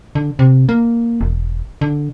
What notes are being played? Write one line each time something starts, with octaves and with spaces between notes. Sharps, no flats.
D3
C3
A#3
E1
D3